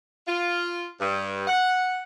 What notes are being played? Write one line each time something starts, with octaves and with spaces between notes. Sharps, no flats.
F4
G2
F#5